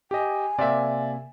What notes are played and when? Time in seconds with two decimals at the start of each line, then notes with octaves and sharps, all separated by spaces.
0.11 G4 D#5 G#5
0.59 C3 A#3 D5 E5